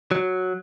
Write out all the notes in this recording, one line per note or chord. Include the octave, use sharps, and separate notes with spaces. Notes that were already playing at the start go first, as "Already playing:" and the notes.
F#3